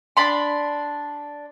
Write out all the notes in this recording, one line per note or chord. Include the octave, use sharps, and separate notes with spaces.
D4 B5 C6